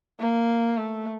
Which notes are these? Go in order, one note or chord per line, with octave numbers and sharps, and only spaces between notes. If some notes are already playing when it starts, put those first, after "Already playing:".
A#3
A3